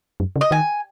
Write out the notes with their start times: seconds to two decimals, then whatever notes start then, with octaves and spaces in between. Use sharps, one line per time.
0.20 F#2
0.36 C#3
0.41 D#5
0.51 D#3 G#5